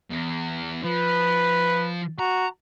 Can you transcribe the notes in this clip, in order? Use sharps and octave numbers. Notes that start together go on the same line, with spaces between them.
E2
F3 B4
F#4 A#5